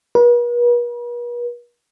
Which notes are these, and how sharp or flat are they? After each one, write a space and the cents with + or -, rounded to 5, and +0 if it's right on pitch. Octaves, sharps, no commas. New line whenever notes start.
B4 -45